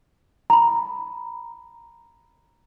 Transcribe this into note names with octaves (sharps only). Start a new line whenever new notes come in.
A#5 B5